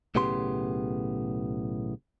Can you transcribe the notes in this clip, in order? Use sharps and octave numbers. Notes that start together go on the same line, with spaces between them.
B1 A2 C#3 B3 G4 C6